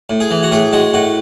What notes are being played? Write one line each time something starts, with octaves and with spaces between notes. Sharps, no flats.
A2
G#4
E3
F#4
A2 G#4
G#3 F#4
A2 F#4